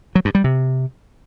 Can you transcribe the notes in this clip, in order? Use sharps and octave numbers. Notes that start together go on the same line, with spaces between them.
F#3
G2
G3
C3